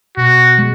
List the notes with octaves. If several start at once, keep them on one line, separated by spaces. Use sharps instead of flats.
B2 F#4
G#3